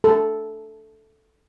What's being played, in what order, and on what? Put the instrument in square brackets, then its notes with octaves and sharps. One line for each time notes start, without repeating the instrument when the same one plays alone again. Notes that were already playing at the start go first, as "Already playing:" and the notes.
[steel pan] A4